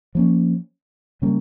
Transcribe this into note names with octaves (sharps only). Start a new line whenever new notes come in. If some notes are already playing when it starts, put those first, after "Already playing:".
F3 A#3 C#4
C#3 G3 A#3 C#4